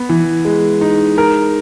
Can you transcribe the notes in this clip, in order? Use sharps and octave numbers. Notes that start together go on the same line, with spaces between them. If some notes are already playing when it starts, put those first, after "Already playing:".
Already playing: B3
E3
G#3
D#4
A#4